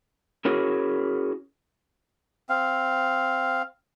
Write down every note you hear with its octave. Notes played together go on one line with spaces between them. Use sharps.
C#4 E4 F#4 G#4 A#4 C#5
C4 F5